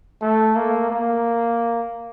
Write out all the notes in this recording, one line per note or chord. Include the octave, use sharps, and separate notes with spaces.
A3
A#3
A#3